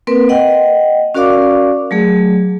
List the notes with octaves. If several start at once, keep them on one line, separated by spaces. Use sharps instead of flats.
A#3 C4 A#4 B4
D#5 F#5 G5
C#4 F#4 A#4 D5 F5 D6
F#3 A3 G#4